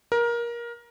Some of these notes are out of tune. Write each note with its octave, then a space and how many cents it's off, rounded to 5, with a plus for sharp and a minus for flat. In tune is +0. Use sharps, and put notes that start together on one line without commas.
A#4 +20